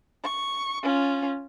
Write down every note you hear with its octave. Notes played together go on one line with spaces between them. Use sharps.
C#6
C#4 F4